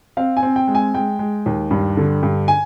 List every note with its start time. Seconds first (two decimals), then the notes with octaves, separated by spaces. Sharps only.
0.17 C4 F5
0.37 G#5
0.43 C4
0.56 G5
0.68 G#3
0.75 G#5
0.94 G#3 G5
1.19 G#3
1.46 D#2
1.71 G2
1.97 D3
2.23 G2
2.48 G#5